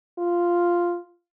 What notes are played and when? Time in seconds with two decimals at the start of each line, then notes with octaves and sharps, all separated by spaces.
0.18 F4